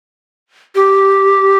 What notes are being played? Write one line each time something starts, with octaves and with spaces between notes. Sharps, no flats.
G4